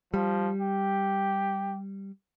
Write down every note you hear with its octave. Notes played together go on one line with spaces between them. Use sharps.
F3 G3
G4